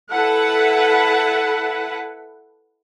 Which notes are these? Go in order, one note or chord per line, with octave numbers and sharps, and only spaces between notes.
E4 A4 B4 F#5